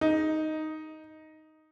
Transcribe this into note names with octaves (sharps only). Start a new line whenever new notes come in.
D#4